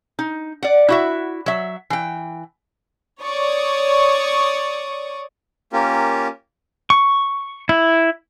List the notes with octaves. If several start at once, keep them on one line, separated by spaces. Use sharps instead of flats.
D#4
D5 F#5
E4 F#4 E5
F#3 E5
E3 G5
C#5 D5 C#6 D#6
A#3 C#4 F4 G4 A#4
C#6
E4